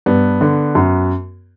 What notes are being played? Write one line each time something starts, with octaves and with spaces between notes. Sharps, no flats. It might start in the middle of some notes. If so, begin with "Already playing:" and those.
G2 B3
D3
F#2